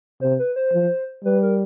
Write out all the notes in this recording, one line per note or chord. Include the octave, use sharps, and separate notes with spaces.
C3 C5
B4
C5
F3
G3 B4
A#4